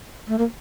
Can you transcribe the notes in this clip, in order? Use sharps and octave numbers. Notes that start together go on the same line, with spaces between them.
A3
A#3